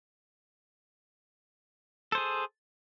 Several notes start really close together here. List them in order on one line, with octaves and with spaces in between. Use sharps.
A4 C5 G#4